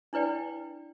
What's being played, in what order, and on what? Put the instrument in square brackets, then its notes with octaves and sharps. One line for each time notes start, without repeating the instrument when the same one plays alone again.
[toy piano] D4 E4 B4 D5 G5